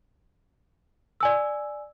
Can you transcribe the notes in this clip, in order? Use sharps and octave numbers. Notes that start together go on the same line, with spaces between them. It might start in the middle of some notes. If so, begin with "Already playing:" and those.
D5 G#5 E6